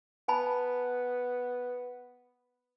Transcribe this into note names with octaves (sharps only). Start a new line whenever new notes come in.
B3 G#5 A5 B5